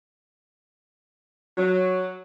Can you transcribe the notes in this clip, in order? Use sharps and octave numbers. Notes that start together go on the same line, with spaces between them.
F#3